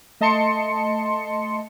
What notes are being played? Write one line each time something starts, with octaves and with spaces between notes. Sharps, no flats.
A3 D#5 A5 C6 C#7